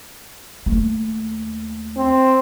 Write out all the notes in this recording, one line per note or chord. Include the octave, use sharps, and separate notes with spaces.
D#2 A3
C4